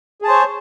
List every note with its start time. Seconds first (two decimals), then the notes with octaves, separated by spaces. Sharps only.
0.22 G#4
0.25 A5
0.28 C5
0.31 C#5